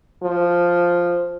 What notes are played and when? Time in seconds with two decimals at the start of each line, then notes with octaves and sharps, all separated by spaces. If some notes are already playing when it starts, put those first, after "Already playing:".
0.23 F3